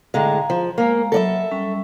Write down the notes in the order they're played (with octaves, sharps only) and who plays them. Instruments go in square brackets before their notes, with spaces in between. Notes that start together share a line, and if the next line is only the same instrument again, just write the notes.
[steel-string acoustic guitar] A2 D3 G#3 [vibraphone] F5 A#5
[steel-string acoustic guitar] F3
[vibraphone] G#3 F5 A#5 [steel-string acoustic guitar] A#3
[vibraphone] F#3 B5 [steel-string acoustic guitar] A4 D5 E5
[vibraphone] G3 C#4